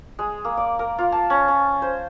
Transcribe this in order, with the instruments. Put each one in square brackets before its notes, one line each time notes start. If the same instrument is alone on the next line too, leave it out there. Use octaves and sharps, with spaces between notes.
[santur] G#3
A#3
D5
A#4
F4
A5
C#4
C#4
C5